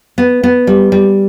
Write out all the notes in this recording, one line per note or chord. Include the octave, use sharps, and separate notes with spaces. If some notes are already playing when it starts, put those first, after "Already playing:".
B3
B3
G3
G3